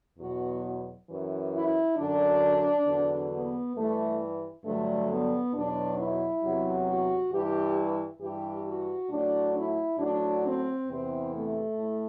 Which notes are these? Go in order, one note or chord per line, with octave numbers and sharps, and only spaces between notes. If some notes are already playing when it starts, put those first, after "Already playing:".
E2 B2 F#3 F#4
F#2 E3
E4
F#2 D3 F#3 D4
E2 D3 F#3
B3
G2 E3 A3
G2 D3 F#3 A3
B3
E2 B2 F#3 D4
E4
E2 C3 F#3
F#4
G2 E3 G4
G2 E3 G4
F#4
A2 F#3 D4
E4
A2 F#3 D4
C4
E2 C3 E3 C4
A3
A2